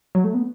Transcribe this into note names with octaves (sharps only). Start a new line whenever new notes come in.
F#3
A3
B3